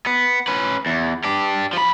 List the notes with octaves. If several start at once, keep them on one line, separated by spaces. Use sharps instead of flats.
B3
C#4 B4
E2
D4 G4
F3 B5